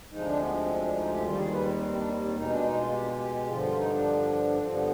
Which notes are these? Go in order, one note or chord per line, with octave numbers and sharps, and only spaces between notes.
D2 C3 F3 G#3 D#4
D4
B3
C4
C4
D4
D#4
G4
D#2 D#3 G3 F4
G#4
B4
C4
C4
D4
C4
B2 G#3 D#4
D4
D#4
F4
G4
G4
G4
G2 D3 F3 F4
F4
D#4
D4
G2 D3 F3 C4
B3